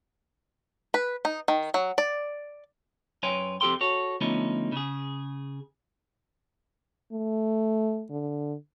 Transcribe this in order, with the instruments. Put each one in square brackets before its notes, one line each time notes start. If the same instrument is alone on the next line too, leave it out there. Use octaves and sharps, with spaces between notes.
[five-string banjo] B4
D#4
D#3
F#3
D5
[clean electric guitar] F#2 B4 C#5 G5 G#5 C6
F2 C4 G4 A4 G5 C6
F#4 A4 C#5
D3 F3 A3 B3 C#4 D#4
C#3 G#4
[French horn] A3
D3